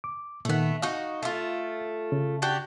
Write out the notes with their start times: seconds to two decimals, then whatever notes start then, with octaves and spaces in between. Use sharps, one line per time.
0.04 D6
0.45 A#2 D#3 A3 B3
0.82 D#4 F#4 D#5 F5
1.23 A3 F4
2.12 C#3
2.42 D4 F#4 G4